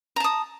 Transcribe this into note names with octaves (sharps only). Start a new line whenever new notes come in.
A5 A#5 D#6